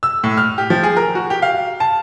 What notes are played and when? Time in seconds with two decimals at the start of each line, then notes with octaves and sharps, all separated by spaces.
0.03 E6
0.24 A2
0.38 F6
0.58 G4
0.70 F3
0.84 G#4
0.97 A#4
1.15 F#4
1.30 G4
1.42 F5
1.80 A5